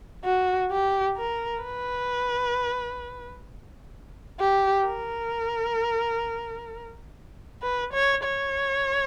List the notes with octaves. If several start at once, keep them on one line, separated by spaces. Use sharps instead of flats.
F#4
G4
A#4
B4
G4
A#4
B4
C#5
C#5